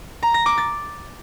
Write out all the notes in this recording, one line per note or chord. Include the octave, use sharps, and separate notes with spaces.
A#5
A#6
D6
A6